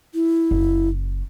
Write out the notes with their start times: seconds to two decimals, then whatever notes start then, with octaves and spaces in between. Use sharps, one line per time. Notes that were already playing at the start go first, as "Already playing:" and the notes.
0.14 E4
0.51 F#1